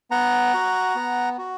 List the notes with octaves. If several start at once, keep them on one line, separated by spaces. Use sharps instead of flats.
B3 F#5 A#5
F#4
B3
F#4